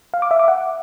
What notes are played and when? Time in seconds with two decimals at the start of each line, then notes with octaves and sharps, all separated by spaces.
0.14 F5
0.22 D6
0.31 E5
0.39 D6
0.48 F#5